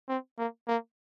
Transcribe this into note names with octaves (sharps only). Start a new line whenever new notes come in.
C4
A#3
A#3